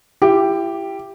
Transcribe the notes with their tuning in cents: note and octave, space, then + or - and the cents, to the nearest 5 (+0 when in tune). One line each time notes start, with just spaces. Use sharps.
E4 +35 G4 +0